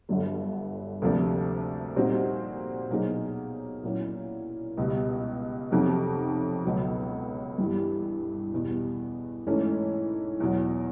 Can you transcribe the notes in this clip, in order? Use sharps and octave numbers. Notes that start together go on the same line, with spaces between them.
G1 G2 D3 F#3
D2 C3 F3 A#3 D4
A#2 G3 C4 D#4 F#4
B2 F#3 A#3 D#4 G#4
A#2 F#3 A#3 C#4 E4
C#2 B2 G3
F2 C3 D#3 F#3
C#2 B2 F#3
G2 E3 G3
E2 B2 G3
G#2 E3 A3 C#4
E2 B2 F#3